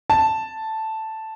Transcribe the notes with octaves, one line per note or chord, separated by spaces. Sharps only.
A5